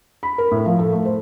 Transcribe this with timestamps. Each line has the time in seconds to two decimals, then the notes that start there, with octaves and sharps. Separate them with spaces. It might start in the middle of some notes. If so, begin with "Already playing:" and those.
0.23 B5
0.38 A#4
0.51 A2
0.66 F3
0.79 A4
0.93 A3
1.05 C5